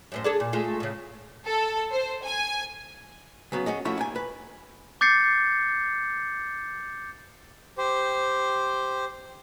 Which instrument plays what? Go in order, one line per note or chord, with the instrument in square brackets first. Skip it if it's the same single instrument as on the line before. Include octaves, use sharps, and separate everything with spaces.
[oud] F#2 A2 C5
D4 G#4 A4
A#2
G#3 A3 F4
A2 C#3
[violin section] A4
C5
G#5
[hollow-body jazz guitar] C#3 F#3 B3
C#4 F#4 G#4 D#5
F3 A3 C#4 E4 F#4 C#5
D#2 D#3 G#5
B4
[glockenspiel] D6 G6 A6 C7 C#7
[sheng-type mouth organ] G4 C5